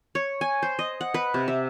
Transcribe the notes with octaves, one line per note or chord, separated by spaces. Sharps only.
C#5
G#5
C5
D#5
F#5
B4
C3
E5